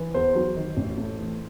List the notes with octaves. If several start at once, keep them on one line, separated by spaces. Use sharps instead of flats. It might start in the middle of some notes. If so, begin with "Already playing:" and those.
Already playing: E3
E2 C5
F#3
D#3
A1
A3
E3